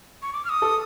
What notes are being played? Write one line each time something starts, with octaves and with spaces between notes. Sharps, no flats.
C#6
D6
F6
D#6
A4